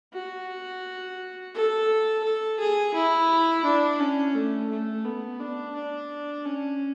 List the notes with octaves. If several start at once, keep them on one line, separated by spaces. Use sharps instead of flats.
F#4
A4
A4
G#4
E4
D4
C#4
A3
A3
B3
D4
D4
C#4